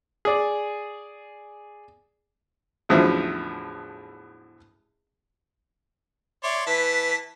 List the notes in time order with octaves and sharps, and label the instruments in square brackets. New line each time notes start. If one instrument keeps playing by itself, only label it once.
[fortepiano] G#4 D5
A1 E2 A2 D3 F3 F#3
[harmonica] C#5 D5 C6 [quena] E5
[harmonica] E3 A5 [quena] B4 [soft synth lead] B6